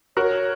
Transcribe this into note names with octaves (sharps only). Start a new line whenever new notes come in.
F#4 A#4 C#5